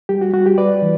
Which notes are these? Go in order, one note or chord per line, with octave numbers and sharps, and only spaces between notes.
G3 G4
F#4
G3 F#4
G4
G3 B4 D5
E3